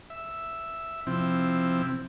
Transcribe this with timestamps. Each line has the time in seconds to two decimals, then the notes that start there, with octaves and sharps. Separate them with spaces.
0.10 E5
1.07 C3 F3 C4 E4